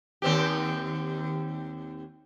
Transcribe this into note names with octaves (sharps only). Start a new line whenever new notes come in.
D#2 C4 G4